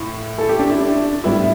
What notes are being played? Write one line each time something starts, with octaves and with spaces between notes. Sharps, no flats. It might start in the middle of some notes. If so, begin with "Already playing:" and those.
Already playing: A2
A4
G4
D4
E4
D4
A2 G3 B3 E4